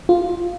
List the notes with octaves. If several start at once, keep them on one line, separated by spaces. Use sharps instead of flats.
F4